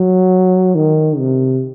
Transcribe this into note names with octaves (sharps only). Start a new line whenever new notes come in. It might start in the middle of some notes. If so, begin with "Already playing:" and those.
Already playing: F#3
D#3
C3